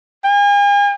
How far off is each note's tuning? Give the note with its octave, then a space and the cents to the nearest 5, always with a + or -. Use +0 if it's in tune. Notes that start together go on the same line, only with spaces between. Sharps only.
G#5 -40